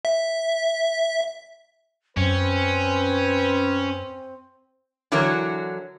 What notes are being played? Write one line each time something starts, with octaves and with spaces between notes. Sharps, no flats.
E5
F#2 C4 C#4 B4
D3 E3 F#3 F#4 A#4 C#5